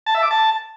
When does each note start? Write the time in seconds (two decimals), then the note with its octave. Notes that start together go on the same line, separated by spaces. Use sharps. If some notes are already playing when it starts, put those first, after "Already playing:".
0.06 A5
0.15 E5
0.23 D6
0.31 A5